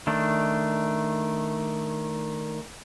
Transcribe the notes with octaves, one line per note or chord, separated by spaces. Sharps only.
D#3 A3 D4